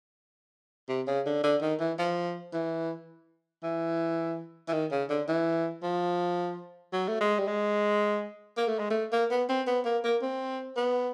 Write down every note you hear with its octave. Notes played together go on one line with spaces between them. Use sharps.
C3
C#3
D3
D3
D#3
E3
F3
E3
E3
E3
D#3
C#3
D3
E3
F3
F#3
A3
G#3
G3
G#3
A#3
A3
G#3
A3
A#3
B3
C4
B3
A#3
A#3
C4
B3